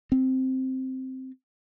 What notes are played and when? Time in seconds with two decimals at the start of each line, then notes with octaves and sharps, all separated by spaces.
0.12 C4